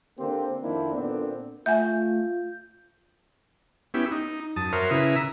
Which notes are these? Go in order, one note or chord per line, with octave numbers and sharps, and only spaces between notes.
D3 A#3 C4 G4 C5
F2 D#3 A#3 C4 D4 E4
A#2 D3 B3 C4 D4
A3 F4 E5 F#5 G#5 G6
B3 C#4 E4 G4
D#4
F#2 A5 D#6
F#4 A#4 C5 C#5 E5 F6
C#3 E4 B4 E5 A#5 D#6